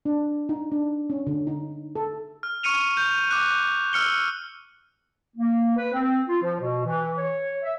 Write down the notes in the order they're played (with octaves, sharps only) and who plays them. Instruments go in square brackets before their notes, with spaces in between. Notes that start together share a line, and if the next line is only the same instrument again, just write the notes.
[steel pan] D4
D#4
D4
C#4
D3
D#4
A4
[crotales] F6
C#6 F6 C#7 D#7 F7
G6 F7
D6 F#6
E6 F6 C#7 G7
[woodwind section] A#3
B4
C4
F4
F3
B2
E3
C#5
E5